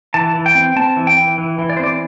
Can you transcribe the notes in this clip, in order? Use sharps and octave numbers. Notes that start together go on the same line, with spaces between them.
E3 A5
E3
G5
C4
C4 A5
E3
G5
E3
E3
E3
D5
C5
C4 D5